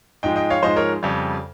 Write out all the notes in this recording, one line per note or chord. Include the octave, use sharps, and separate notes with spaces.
G#2 F3 G#3 D#5 G5
D#5 G5
C#5 F5
G#2 F3 G#3 C5 D#5
A#4 C#5
F2 C#3 G3